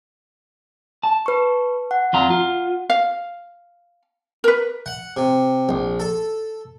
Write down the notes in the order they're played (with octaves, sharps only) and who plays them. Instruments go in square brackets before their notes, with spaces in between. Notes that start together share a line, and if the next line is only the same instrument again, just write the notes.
[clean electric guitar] A5
[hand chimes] B4 C#6
F#5
[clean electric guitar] F2 F4 A#5
F4
[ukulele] F5
A#4 B4
[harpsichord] F#5
C3
A#1
A4